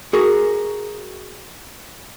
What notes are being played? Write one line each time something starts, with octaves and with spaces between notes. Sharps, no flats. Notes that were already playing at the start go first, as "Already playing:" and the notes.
F#4 G#4 A#4